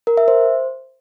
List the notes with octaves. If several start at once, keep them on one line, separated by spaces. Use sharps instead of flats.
A#4
E5
C5